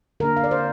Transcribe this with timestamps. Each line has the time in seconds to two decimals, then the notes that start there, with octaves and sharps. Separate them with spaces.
0.20 D3 A#3 D4 A#4
0.37 F5
0.44 D5
0.51 C5